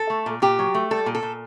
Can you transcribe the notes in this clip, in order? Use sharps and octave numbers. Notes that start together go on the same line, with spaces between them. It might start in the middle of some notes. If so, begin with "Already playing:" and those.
Already playing: A4
A3
A#2
A#2 G4
F#3
A3
G3 A4
A#2
A4
A#2